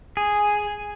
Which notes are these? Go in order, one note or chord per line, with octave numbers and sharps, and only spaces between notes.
G#4